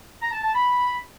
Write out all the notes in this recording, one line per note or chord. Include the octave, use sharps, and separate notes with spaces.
A#5
A5
A5
B5